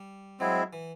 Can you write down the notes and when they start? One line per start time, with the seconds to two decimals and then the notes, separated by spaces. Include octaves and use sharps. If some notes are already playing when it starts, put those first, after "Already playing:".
Already playing: G3
0.40 F#3 G#3 C4 E4
0.73 E3